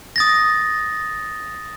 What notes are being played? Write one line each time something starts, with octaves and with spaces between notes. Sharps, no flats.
D#6 A6 A#6